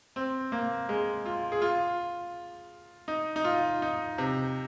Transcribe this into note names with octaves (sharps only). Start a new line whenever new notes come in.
C4
A#3
G#3
F4
G#4
F4
D#4
D#4
F4
D#4
C3